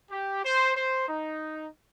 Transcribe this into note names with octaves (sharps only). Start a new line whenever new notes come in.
G4
C5
C5
D#4